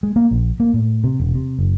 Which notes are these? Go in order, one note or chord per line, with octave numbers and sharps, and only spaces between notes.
G#3
A#3
A#1
A#3
A2
C3
E1
C3
F#1